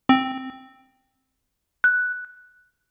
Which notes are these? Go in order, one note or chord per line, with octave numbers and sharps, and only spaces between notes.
C4
F#6